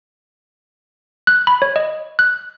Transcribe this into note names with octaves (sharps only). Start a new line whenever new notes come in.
F#6
B5
C#5
D#5
F#6